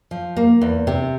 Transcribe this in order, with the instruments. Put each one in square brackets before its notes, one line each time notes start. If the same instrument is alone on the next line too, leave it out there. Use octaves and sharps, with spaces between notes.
[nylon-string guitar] F3
A#3
E2
C3